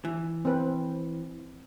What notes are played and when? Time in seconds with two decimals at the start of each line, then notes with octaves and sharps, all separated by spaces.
0.05 E3
0.45 C4 B4